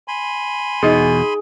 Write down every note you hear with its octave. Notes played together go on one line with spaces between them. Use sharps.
G#5 B5 C6
E2 B2 D#4 G#4 D#5